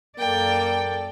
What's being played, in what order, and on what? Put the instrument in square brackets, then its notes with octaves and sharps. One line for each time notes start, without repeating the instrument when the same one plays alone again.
[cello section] F#2 A4 D5 [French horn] A#3 [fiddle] G5